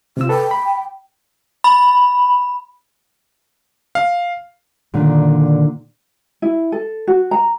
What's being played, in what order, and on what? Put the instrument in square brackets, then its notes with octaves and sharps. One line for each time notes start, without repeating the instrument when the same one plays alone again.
[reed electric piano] C3 E6 [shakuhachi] F4
[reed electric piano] A4 B4 [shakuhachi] G5
[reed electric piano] B5
[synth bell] B5
[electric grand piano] F5
[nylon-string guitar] A#2 D3 D#3
[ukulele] E4
A4
F#4
A#5